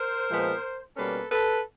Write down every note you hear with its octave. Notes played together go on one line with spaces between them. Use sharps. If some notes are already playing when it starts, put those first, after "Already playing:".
Already playing: A#4 C5
A#2 F3 G#3 B3
B2 G3 A#3 C#4 A4 B4
A4 B4